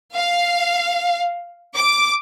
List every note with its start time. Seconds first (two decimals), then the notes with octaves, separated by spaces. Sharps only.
0.15 F5
1.76 D6